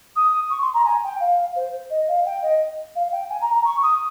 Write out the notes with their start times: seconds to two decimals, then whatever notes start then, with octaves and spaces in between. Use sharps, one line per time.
0.16 D#6
0.50 C#6
0.62 C6
0.74 A#5
0.85 G#5
1.04 G5
1.20 F5
1.56 C5
1.90 D#5
2.08 F5
2.26 G5
2.42 D#5
2.96 F5
3.12 G5
3.30 G#5
3.41 A#5
3.54 A#5
3.65 C#6
3.83 D#6